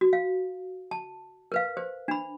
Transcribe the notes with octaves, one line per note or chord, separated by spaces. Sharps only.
F#4
F5
A5
A#4 B4 F5
C5
D4 B5